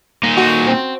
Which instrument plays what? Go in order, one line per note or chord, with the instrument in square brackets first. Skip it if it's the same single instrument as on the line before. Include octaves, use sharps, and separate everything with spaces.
[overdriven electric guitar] A#2 D#4
[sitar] F#4 A4
C4